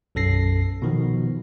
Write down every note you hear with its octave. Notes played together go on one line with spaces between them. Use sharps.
B1 F#2 A4 A#6 C7
B2 D#3 F3